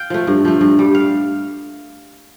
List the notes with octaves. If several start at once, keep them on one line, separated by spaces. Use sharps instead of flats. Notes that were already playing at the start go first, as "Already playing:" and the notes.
Already playing: F5 G5
F3 A3
G2
F3 A3
G2
G3
F5